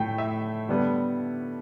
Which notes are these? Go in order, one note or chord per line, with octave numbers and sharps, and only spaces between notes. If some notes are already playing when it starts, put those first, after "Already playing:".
Already playing: A2 A3 G5
E5
D3 G3 B3